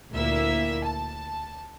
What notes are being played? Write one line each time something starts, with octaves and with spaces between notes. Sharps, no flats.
D2 A#2 A#3 E4 E5 E6
A5